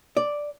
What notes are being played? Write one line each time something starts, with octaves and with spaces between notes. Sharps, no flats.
D5